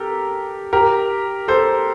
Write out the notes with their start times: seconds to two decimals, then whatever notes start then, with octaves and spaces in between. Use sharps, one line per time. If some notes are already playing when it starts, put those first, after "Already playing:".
Already playing: G4 A4 A#4
0.73 G4 A#4
1.48 A4 C5